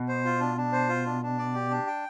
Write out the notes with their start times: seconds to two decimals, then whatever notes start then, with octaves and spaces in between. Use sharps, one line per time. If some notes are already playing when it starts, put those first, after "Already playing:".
Already playing: B2
0.09 C5
0.25 F4
0.40 D4
0.57 D4
0.73 C5
0.89 F4
1.06 D4
1.23 D4
1.38 D5
1.54 G4
1.71 D4
1.87 G5